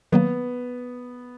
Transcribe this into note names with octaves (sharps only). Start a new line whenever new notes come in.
D#3 F#3 A#3 B3